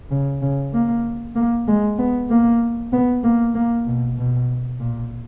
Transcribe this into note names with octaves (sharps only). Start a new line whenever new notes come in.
C#3
C#3
A#3
A#3
G#3
B3
A#3
B3
A#3
A#3
B2
B2
A#2